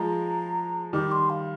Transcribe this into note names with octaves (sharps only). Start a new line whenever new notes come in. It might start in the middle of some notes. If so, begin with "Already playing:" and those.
Already playing: F3 G#3 A#5
D#3 G3 D6
C6
F5